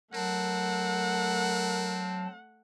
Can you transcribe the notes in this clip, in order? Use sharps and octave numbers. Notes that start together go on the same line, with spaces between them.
F#3 A3 C4 A#4 F#5 A5